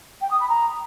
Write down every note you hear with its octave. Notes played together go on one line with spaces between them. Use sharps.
G5
D#6
B5
A#5